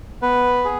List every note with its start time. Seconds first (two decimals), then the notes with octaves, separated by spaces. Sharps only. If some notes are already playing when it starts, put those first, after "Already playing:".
0.22 B3 B4
0.65 G#4